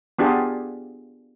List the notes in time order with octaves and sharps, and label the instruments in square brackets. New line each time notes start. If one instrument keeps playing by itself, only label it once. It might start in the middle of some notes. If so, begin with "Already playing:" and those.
[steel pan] B3 D4 F4 G4 G#4